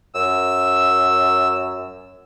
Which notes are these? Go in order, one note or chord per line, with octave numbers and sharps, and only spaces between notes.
F#2 E6